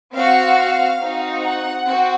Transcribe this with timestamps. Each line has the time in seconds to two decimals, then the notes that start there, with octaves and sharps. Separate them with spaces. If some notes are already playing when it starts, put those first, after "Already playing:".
0.12 C4 F#4 F5
1.00 C4 D#4 F#4
1.43 F#5
1.86 C4 F#4